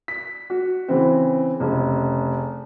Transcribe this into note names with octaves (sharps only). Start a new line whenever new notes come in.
B6
F#4
C#3 E3 C4
F1 C#3